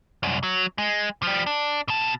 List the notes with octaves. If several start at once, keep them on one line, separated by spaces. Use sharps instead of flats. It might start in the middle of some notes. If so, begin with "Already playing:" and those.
C2 F#2
F#3
G#3
F3 G3
D4
B2 A5